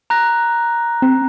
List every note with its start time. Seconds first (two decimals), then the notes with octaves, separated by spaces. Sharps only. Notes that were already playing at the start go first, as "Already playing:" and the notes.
0.10 A#5 F#6 A#6
1.02 C4